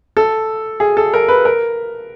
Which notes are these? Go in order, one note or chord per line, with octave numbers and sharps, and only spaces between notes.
A4
G#4
A4
A#4
B4
A#4